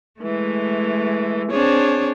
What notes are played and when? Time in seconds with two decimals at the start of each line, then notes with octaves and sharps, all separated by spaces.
0.20 E3 G#3 A3
1.50 C4 D4 G#4 C5 C#5